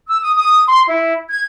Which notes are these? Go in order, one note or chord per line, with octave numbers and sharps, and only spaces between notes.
E6
D#6
D#6
C6
E4
G#6